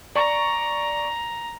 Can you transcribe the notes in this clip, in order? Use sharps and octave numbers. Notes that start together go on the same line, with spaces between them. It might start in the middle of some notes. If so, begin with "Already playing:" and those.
D5 A#5 C#6